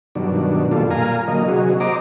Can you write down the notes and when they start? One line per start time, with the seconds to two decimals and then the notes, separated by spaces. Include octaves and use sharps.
0.15 G2 B2 D#3 F#3 D4
0.72 F#2 A#2 G3 F4 A4
0.91 A#2 F5 G#5 A#5
1.28 D3 F#3 A#3 D#5
1.48 C3 F#3 F#4 G#4
1.80 C5 D#5 A#5 D6